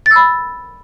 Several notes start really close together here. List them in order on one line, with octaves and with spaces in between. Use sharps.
A6 E6 B5